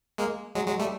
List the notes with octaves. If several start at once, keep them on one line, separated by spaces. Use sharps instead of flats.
G#3 A#3
F#3 G#3
F#3 G#3
G3 A3